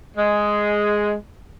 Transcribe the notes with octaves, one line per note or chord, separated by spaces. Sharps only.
G#3